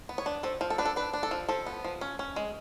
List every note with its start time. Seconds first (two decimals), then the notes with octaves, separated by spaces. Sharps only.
0.09 B3
0.18 C#5
0.26 D4
0.43 F3 A4
0.61 F3
0.70 A4
0.78 D4 B4
0.85 A4
0.96 D4 B4
1.13 D4
1.23 A4
1.31 F3
1.49 F3 A4
1.66 B3
1.84 F3
2.01 C#4
2.19 C#4
2.36 G#3